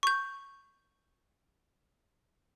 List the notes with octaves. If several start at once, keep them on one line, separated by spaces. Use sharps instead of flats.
C#6 G6